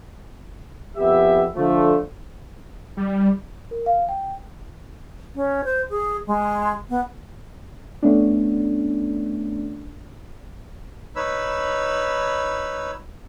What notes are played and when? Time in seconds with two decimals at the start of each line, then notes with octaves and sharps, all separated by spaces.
0.96 F2 B3 G4 E5
1.56 D3 F3 A3
2.97 G3
3.71 A#4
3.86 F5
4.09 G5
5.35 C#4
5.64 C5
5.90 G#4
6.27 G#3
6.89 B3
8.03 A3 B3 C#4 D4
11.16 D#4 B4 C#5 B5 E6